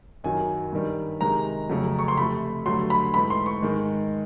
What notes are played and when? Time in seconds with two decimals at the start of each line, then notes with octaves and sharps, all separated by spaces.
0.24 F#2 D#3 F#3 G#5
0.72 G2 D#3 G3
1.21 C3 D#3 G#3 A#5
1.69 F2 C#3 F#3 A3
1.99 C#6
2.08 C6
2.17 C3 F3 A3 B5
2.66 G2 D3 F#3 A3 C6
2.90 B5
3.14 G#2 E3 A3 B5
3.30 C6
3.46 C#6
3.62 G#2 D#3 G#3